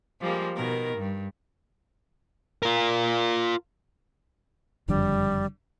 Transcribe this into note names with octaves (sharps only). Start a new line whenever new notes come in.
F3 G3 G#3 A#3
B2 D#3 A#4
G2
F4 A#4
F#1 F2 D3 G3